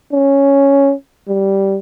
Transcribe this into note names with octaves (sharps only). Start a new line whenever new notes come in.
C#4
G3